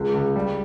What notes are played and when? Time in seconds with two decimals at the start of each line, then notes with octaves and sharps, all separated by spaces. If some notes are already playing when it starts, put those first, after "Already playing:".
Already playing: C#2 G#3
0.14 C#2
0.36 G3